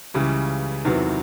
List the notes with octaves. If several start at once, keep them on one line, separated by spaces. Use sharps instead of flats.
C#2 C#3 E3 G3
E2 C3 D#3 F#3 B3